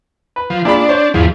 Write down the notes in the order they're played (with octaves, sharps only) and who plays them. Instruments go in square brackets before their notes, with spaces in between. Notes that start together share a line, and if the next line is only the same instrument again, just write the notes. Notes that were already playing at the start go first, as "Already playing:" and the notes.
[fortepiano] B4
[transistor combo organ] F3
[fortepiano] A#2 G#3 B5 [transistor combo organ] D4
[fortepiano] C5 C#5
[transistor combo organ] E2 G#2 F3